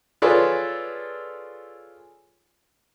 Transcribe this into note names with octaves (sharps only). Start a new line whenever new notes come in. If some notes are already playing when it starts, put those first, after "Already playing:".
F4 G#4 A4 B4 C#5 D5